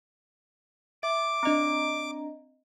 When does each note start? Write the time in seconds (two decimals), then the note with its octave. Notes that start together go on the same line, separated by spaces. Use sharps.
1.03 E5 D6
1.43 C4 D4 D#5 A#5